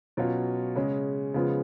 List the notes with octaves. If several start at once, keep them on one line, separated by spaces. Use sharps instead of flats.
B2 F#3 C#4 F4
C#3 G#3 C#4
C#3 F3 G#3 B3 F4